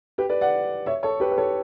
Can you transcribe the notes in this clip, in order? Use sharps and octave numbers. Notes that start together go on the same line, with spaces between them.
G4 B4
B4 D5
D5 F#5
C#5 E5
A4 C#5
G4 B4
B4
A4 C#5